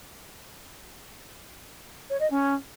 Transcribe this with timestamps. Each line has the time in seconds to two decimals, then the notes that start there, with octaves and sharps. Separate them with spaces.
2.09 C#5
2.20 D#5
2.30 C#4